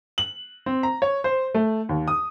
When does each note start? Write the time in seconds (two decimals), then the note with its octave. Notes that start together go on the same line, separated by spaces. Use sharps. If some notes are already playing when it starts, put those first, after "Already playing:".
0.18 F#7
0.66 C4
0.83 A#5
1.02 C#5
1.24 C5
1.54 A3
1.89 D#2
2.08 D#6